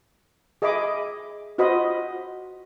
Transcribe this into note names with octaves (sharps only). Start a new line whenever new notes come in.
G#4 D#5 E5 G#5 B5 D6
F4 F#4 C5 D#5 B5